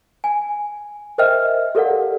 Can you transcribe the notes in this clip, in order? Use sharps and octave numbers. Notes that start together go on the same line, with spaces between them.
G#5
A#4 C5 D#5 E5 G5 F6
G4 A4 A#4 D5 F5 F#5